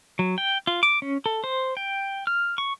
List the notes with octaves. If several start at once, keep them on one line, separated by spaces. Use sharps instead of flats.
F#3
G5
F4
D6
C#4
A4
C5
G5
F6
C#6